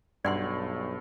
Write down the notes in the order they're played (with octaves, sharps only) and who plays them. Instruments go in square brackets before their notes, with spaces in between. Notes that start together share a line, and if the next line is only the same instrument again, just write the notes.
[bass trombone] B1 [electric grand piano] G2 [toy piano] D5 F#5 C6